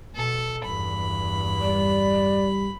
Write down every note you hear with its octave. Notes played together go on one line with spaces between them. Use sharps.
B2 A4
E2 G2 B5
G3 D5